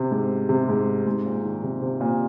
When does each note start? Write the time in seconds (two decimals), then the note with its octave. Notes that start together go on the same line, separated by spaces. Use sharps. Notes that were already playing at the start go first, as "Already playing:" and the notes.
Already playing: C3
0.11 G#2
0.49 C3
0.69 G#2
1.07 G#2
1.26 A#2
1.44 D#3
1.63 C3
1.82 C3
2.01 A#2